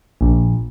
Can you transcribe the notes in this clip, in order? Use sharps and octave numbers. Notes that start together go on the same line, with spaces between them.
A#1